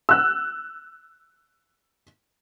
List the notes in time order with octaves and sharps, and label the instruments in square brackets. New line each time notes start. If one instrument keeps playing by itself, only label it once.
[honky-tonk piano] E6 F#6